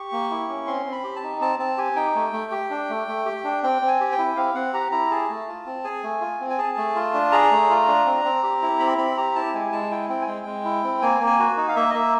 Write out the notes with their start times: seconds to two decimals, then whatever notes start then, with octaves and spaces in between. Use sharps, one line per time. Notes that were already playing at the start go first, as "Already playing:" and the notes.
Already playing: G4 C#6
0.12 A#3
0.31 E4
0.49 C#4
0.67 C4 C6
0.86 C4
0.92 B5
1.04 G4
1.16 A5
1.23 D#4
1.41 C4 A5
1.59 C4 A5
1.77 G4 G#5
1.96 D#4 G5
2.16 A3
2.33 A3
2.51 G4
2.70 D4
2.90 A3
3.08 A3
3.25 G4
3.44 D4
3.63 C4 G5
3.82 C4
3.88 G#5
4.00 G4
4.12 G5
4.18 E4
4.36 C4 F5
4.55 C4 F#5
4.73 G4 A#5
4.92 E4 A#5
5.11 G#4 A5
5.29 A3
5.48 F4
5.66 C4
5.84 G#4 G#5
6.03 A3
6.21 F4
6.40 C4
6.50 G#5
6.58 G#4 A5
6.77 A3
6.96 F4
7.14 D4
7.32 G#4 A#5
7.51 A3
7.70 F4
7.88 D4
8.06 C4
8.25 C4
8.43 G4
8.62 E4
8.80 C4 B5
8.98 C4 B5
9.17 G4 A#5
9.35 E4 A5
9.54 G#3 G#5
9.72 G#3 A5
9.91 E4 G5
10.09 C4 G5
10.22 G#5
10.27 G#3 G5
10.46 G#3
10.65 E4
10.84 C4
11.02 A#3 G#5
11.20 A#3
11.26 G#5
11.39 F#4
11.57 D#4
11.69 F5
11.76 A#3 E5
11.90 D#5
11.94 A#3 E5